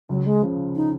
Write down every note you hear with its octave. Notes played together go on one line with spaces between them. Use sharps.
C#2 F#3
G#3
C#3 F3
D#4